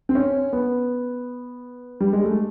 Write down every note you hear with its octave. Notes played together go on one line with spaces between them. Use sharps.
C4
C#4
B3
G3
G#3
A3